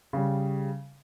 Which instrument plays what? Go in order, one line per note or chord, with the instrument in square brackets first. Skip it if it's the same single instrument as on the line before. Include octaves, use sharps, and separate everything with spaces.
[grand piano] C#3 G3